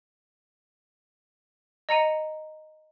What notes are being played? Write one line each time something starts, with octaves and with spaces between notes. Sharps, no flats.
D#5 A#5 C#7 D#7